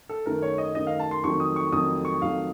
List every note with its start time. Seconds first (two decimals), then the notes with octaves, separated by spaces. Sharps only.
0.09 A4
0.26 F#2 D#3 A3 A#4
0.42 C#5
0.58 D#5
0.74 F#2 D#3 A3 D#5
0.87 F5
0.99 A5
1.11 C6
1.24 F2 D#3 F#3 A3 C#6
1.40 D#6
1.56 C#6
1.72 F2 D#3 F#3 A3 D#6
2.05 C#6
2.22 F2 D#3 F#3 A3 F5